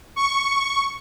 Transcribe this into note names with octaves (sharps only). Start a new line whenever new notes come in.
C#6